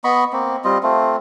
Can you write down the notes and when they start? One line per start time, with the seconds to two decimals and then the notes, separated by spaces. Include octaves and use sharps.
0.04 B3 D#5 B5 C#6
0.33 A#3 C4
0.64 G3 C4 F4 D#5
0.83 A3 C4 F4